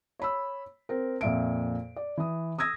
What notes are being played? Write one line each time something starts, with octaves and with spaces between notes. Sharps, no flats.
C#5 B5 E6
C4 A#4
F2 A#2 E5 D7
D5
E3 D#6
D#6 E6 G#6 A#6